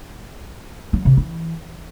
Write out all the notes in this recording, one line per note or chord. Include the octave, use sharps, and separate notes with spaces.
F#3
C3
E3